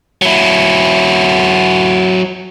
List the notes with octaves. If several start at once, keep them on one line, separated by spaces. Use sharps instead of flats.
F#3 E4